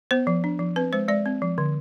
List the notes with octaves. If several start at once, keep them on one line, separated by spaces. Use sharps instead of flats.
B3 C5
F3
D4
F3
C4 B4
G#3 C5
G#3 D5
C4
F3
D3